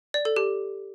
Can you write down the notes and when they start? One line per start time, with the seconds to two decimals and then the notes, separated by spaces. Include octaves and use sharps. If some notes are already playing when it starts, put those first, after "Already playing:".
0.14 D5
0.25 A4
0.36 G4